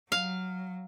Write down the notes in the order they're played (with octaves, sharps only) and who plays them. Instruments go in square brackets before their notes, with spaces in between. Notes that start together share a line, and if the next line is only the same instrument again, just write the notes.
[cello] F#3 [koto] F5